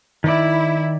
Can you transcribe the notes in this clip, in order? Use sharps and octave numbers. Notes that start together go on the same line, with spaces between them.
D#3 E4 D5